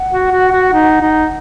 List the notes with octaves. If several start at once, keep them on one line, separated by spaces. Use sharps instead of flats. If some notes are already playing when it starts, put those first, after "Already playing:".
Already playing: F#5
F#4
F#4
F#4
D#4
D#4